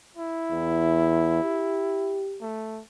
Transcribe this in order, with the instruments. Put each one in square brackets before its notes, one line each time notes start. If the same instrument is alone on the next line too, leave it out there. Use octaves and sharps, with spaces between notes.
[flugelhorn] E4
[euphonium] E2
G4
[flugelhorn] A3